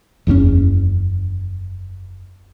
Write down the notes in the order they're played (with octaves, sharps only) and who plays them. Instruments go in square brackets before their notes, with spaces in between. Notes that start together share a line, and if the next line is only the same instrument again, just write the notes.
[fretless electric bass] F#1 E2 C3 C#4